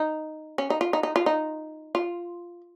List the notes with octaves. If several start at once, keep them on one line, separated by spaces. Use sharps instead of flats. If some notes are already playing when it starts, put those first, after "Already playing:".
Already playing: D#4
C#4
D#4
F4
D#4
D#4
F4
D#4
F4